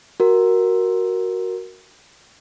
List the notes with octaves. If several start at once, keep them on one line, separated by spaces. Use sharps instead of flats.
F#4 A#4